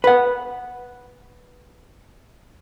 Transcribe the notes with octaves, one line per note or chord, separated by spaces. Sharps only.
B4 F#5